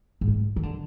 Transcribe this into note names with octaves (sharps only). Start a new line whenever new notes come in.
G#2
A2
D#3
D3